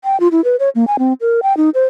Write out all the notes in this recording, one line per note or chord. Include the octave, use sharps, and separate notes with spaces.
G5
F4
E4
B4
C#5
A#3
G#5
C4
A#4
G5
D#4
C5